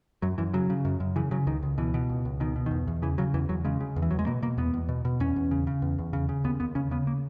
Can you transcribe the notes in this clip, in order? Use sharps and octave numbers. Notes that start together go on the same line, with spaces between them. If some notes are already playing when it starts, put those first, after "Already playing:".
F#2 F#3
F#2 E3
C#3 F#3
C#3
F#2
F#2
C#3 E3
C#3 F#3
C#2 D#3
C#2
B2 E3
B2
C#2
C#2
B2 D#3
B2
E2 D#3
E2
C#3 E3
C#3 F#3
E2 E3
E2 F#3
C#3 G#3
C#3
E2
E3
E2 F#3
G#3
B2 A#3
B2 A#3
E2 B3
E2
B2
B2
E2 C#4
E2
C#3
C#3
E2
E2
C#3
C#3
D#2 B3
D#2 B3
C#3 C#4
C#3 B3
A#3